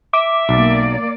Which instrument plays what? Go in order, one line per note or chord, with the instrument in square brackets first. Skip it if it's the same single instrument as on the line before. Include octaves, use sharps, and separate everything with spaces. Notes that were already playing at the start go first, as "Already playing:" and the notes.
[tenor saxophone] E5 [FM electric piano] D6
[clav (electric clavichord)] B1 [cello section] A#3 D5